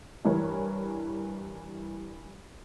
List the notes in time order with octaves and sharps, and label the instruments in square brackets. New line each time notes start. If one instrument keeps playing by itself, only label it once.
[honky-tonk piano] G2 E3 A#4 C#5